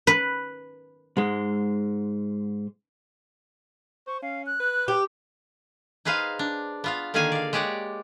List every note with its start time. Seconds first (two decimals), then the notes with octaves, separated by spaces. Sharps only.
0.07 B4
1.17 G#2 G#3
4.07 C5 C#6
4.22 C#4 F5
4.46 F#6
4.60 B4
4.88 G4 G5
6.05 D#4 G#4 B4 C5 F5
6.39 D4
6.84 B3 F4 F5
7.14 D3 D#3 A#3 G#4 F5 G#5
7.32 D5 F5
7.53 G#3 G4 C#5 D5 F#5